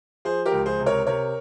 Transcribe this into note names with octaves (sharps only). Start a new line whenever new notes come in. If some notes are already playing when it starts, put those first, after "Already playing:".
F3 G#4 C5
G4 A#4
C#2
G#4 C5
C3
A#4 C#5
C3 A#4 C#5